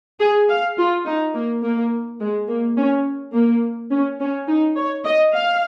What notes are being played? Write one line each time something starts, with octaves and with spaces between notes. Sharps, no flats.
G#4
F5
F4
D#4
A#3
A#3
G#3
A#3
C#4
A#3
C#4
C#4
D#4
C#5
D#5
F5